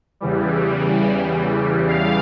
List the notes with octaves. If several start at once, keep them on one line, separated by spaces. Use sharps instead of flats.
E2 C#3 E3 G3
F5